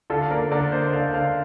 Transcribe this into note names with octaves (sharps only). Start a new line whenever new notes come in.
D3 F4 A4
A#3 A#4 D5
D3 A#4 D5
A#3 C5 D#5
D3 D5 F5
D3 D5 F5